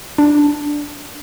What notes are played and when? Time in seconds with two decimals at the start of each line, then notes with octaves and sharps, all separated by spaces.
0.18 D4